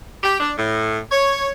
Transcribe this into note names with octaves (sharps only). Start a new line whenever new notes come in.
G4
D4
A2
C#5